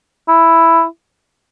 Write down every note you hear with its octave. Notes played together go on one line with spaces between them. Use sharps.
E4